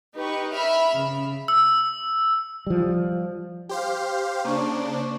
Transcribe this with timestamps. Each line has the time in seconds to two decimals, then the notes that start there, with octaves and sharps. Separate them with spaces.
0.15 D#4 G4 B4 C#6
0.52 E5 B5 F6
0.95 C#3
1.48 E6
2.67 F3 G3
3.69 G4 C5 F5
4.45 C#3 A#3 D4 C5 D5 C#6